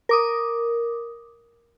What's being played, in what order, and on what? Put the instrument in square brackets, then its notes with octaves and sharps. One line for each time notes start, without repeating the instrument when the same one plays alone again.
[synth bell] A#4 D6 D#6